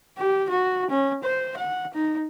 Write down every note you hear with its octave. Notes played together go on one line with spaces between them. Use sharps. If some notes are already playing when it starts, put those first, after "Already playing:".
G4
F#4
C#4
C5
F#5
D#4